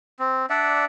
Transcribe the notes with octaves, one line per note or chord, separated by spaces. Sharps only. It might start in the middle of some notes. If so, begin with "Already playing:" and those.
C4
D4 D5 E5 F#5